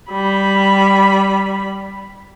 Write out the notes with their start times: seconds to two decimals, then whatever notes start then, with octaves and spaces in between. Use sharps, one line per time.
0.11 G3 B5